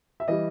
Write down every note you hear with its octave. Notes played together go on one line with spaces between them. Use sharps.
E5
E3 G3 D#5